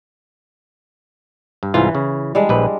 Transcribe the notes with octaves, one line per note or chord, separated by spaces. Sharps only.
G2
C2 G#2 E3 F4
C#3
G3 G#3 D4
A#1 B4